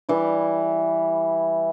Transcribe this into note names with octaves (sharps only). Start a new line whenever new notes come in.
E3 G3 E4